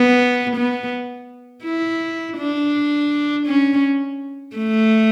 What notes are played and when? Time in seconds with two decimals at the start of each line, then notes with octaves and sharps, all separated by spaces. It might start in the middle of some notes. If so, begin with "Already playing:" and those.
Already playing: B3
0.56 B3
1.64 E4
2.38 D4
3.47 C#4
4.56 A3